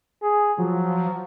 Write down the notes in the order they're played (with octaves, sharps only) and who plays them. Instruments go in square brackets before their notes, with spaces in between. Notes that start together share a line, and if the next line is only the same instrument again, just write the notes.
[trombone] G#4
[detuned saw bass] F3 [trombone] F#3